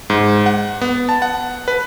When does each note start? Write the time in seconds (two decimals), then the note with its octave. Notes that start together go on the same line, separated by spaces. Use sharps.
0.10 G#2
0.46 F#5
0.81 B3
1.09 A5
1.22 F#5
1.68 B4